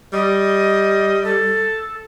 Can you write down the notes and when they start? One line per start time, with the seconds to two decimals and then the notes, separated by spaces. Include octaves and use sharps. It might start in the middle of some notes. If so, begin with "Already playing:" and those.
0.13 G3 D#5
1.24 A4